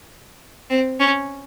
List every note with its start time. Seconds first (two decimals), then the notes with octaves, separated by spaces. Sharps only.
0.70 C4
1.00 C#4